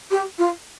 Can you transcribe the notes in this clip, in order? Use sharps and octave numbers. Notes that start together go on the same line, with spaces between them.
G4
F4